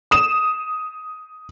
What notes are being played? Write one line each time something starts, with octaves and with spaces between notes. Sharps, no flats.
D#6 E7